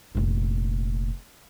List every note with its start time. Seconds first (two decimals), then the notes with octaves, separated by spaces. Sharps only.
0.15 F1 A#2